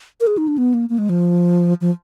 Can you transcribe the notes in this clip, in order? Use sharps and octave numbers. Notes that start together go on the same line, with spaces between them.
A#4
G#4
D#4
D4
B3
A#3
A#3
G#3
F3
F3